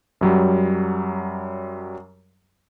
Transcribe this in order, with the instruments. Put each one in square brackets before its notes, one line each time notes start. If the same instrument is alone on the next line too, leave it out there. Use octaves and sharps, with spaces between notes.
[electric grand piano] F#2 F#3 G3